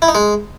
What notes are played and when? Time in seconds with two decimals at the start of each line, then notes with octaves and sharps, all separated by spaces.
0.02 E4
0.08 D#4
0.15 G#3